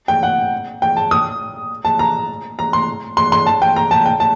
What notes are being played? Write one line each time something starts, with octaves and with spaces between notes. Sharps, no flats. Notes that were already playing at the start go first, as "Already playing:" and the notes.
G5
F#5
G5
A5
D#6
A5
A#5
A#5
C6
C6
C6
A5
G5
A#5
A5
G5
A5